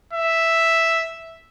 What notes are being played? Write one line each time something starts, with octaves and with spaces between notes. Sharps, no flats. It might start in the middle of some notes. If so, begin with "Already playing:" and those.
E5